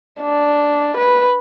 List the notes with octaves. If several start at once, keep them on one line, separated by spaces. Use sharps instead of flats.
D4
B4